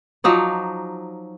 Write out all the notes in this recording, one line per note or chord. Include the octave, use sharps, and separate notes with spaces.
F3 F#3 D#4 D5